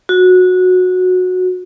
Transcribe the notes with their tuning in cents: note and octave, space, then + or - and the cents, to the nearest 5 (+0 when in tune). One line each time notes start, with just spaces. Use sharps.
F#4 -15